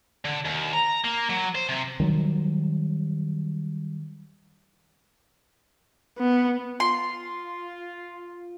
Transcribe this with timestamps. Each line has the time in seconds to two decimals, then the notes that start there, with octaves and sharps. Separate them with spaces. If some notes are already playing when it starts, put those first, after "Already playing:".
0.25 D3
0.45 D#2
0.73 A#5
1.04 A#3
1.30 F#3
1.55 C5
1.69 C3
2.00 D#3 F#3 G3
6.19 B3
6.80 F4 C6